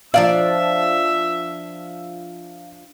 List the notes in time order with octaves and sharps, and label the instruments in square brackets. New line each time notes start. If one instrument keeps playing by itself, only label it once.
[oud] F3 D4 D5 [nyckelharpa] E5 [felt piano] F5